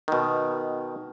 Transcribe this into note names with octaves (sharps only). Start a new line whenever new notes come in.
B2 D#3